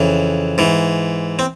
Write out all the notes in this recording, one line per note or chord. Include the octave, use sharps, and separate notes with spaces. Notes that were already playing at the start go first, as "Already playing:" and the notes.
Already playing: F2 C#3 E3
G#2 E3
C4